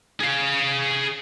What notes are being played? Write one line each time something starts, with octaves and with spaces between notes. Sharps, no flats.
G#4 F5